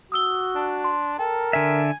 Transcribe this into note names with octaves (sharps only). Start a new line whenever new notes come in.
F#4 D#6 E6 G7
D4
C6
A4 A#4 G5
D3 E5 G#5